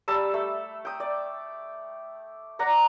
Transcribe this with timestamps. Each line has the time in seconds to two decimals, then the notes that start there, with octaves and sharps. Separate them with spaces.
0.08 G3 A5 E6
0.34 A3
0.85 G5 D#6
1.00 D5
2.59 D5 F#5 A#5